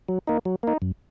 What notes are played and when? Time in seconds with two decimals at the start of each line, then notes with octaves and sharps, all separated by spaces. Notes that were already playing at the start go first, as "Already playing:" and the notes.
0.09 F#3
0.27 A#3 D#4
0.45 F#3
0.63 A#3 D#4
0.82 F#2